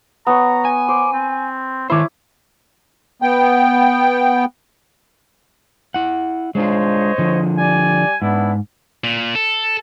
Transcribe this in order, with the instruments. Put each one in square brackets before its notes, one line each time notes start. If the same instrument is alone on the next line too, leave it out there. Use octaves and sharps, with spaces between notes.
[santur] B3 C#5 [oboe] A#5
[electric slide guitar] G#5
[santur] C5 [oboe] D6
[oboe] C4
[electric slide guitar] D#3 C5 [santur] E4 D6 [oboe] C#5
[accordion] B3 G5
[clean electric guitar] E4 F#5
[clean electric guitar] G#3 D4 F4 [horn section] C5 C#5 D#5
[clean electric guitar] D3 F3
[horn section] G3 D5 G#5
[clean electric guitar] G#2 [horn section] B3 D4 E4
[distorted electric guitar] A#2
A4